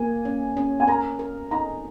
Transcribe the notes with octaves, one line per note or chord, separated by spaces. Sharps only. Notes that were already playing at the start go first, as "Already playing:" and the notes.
Already playing: A#3 G#5
C#4
C#4
G#5
A#4 A#5
A#4
D#4 A#5